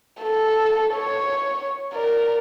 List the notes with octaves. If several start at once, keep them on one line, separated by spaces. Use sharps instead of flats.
A4
C#5
A#4 D5